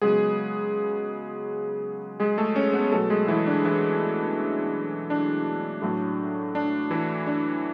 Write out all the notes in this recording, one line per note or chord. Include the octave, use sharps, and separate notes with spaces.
C#3 F#3 G#3 B3 G#4
G#3 G#4
A3 A4
C#4 C#5
B3 B4
B2 F#3 A3 B3 A4
G#3 G#4
E3 E4
D4
E3 E4
D4
A2 F#3 A3
D4
E3 E4
D4